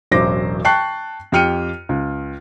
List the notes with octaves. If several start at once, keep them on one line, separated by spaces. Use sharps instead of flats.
E1 A1 F#3 C5 D6 A#6
G5 A5 C#6 F#6 C7
F2 G4 G5 F6 C#7 D#7
C#2